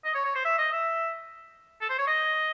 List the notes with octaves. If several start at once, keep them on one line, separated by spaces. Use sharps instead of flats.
D#5
C#5
C#5
C5
E5
D#5
E5
A4
C5
C#5
D#5